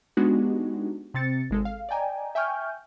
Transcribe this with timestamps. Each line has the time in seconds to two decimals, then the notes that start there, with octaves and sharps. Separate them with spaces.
0.17 G#3 B3 D4 D#4 F#4 G4
1.14 C3 C4 A6 C#7
1.50 G#1 G#3 A4
1.65 F5
1.89 D5 D#5 G5 G#5 A#5
2.35 E5 G5 G#5 C#6 F6 G6